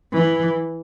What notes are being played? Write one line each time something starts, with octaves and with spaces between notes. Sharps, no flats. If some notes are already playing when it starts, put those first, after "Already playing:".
E3